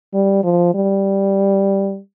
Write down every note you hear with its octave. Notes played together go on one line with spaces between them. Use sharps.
G3
F3
G3